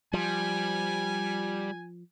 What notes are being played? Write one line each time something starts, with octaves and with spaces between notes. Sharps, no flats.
F3 G3 G#5